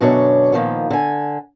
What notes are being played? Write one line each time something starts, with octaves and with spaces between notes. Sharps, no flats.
F#2 B2 D3 D4 G#4 C#5
A#2 D#3 F3 B3
D3 G#5